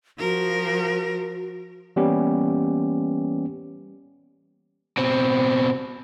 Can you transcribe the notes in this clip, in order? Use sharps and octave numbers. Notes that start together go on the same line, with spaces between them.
F3 F#4 A#4
E3 G3 A#3 B3 C#4 G4
B2 C4